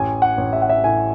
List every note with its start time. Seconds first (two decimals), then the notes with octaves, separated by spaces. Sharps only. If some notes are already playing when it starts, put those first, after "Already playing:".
Already playing: A1 G#5
0.22 F#5
0.38 A1
0.53 E5
0.62 F#5
0.69 E5
0.84 A2 G#5